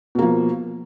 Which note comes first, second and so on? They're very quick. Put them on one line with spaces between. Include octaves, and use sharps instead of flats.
B2 A#3 F3